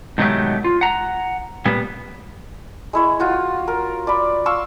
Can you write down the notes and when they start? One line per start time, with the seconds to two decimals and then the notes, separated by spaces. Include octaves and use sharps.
0.18 G#2 B2 D#3 F#3 A3 G4
0.64 F4
0.81 F#5 A#5
1.65 A#2 G3 B3
2.93 G#3 E4 C#5
3.19 F4 F#4 C#5
3.68 A#4
4.07 D5 B5
4.46 F5 C6 C#6 E6